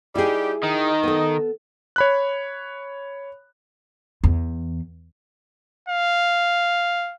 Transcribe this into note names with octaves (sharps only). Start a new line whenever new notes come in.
G3 D#4 E4 G4 G#4
D#3 D#5
B3 A4
C#5 B5 F#6
E2
F5